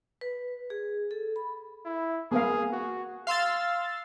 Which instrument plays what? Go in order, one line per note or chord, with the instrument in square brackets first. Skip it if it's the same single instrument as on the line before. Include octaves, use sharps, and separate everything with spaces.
[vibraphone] B4
G#4
A4
B5
[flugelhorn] E4
[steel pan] A#3 B3 F5 [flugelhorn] G#4
[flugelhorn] F#4
[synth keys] F5 C6 E6 A6